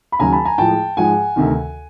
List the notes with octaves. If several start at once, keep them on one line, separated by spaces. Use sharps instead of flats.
B5
D#2 C#3 F#3 G#5 A#5
A5 B5
G#5 A#5
A2 F3 G#3 G5 A5
G#2 F3 G#3 F#5 G#5
D2 C3 D#3